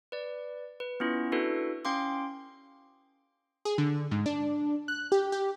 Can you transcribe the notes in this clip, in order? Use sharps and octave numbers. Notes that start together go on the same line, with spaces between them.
B4 D5
B4
B3 C#4 E4 F4
D4 E4 F#4 A4 B4
C#4 F5 G5 C6 D6
G#4
D3
G#2
D4
F#6
G4
G4